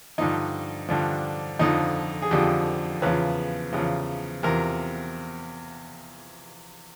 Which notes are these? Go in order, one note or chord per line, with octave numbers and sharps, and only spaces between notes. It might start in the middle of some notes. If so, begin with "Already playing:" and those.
G2 D3 F3 D#4
G2 D3 F3 D4
F2 D3 F3 D#4
G#4
F2 D3 F3 G4
E2 C#3 F3 B4
E2 C#3 F3
E2 C3 F3 A#4